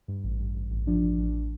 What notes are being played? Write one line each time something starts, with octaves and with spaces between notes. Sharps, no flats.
G2
A1
G2
A1
A1
F3 D4
A1
A1